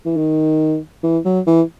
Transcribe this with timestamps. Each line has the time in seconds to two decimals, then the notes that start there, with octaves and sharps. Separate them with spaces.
0.06 E3
0.17 D#3
1.03 E3
1.25 F#3
1.47 E3